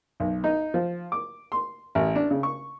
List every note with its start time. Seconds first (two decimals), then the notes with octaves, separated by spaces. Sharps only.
0.20 B1
0.44 D#4
0.74 F3
1.12 D6
1.52 C6
1.95 A1
2.15 D4
2.31 C#3
2.43 C#6